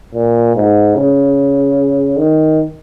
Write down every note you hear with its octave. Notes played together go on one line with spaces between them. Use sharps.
A#2
G#2
C#3
D#3